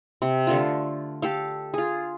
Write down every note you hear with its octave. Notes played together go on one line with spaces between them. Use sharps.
C3
D3 A3 F4
G4 A4 F5
F4 G#4